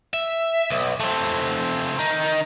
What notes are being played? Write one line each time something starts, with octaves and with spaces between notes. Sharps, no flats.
E5
B1
A3 C4
D#3 D#4